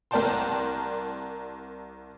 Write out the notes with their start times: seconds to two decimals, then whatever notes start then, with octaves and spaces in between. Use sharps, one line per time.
0.11 C2 A#4 D5 G5 A5 C6